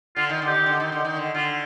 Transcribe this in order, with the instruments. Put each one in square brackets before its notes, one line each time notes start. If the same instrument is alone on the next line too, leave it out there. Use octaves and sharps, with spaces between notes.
[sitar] D3 [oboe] F4
[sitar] D#3
[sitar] D3 [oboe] G4
[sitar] D#3
D3
D#3
D3
D#3
D3
[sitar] D3 [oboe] F4